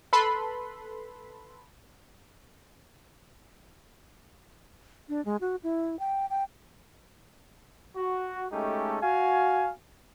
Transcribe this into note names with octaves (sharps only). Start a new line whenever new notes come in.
A4 B4 B5 C6
D4
G#3
F#4
E4
G5
G5
F#4
G#3 A3 C#4 D#4 G4 A4
F#4 F5 G#5